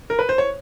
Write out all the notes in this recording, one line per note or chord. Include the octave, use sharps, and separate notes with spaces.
A#4
B4
C5
C#5